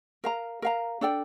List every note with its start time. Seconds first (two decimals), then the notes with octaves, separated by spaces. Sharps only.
0.24 A#4 F5 A#5
0.62 A#4 F5 A#5
1.01 D4 A4 D5 G5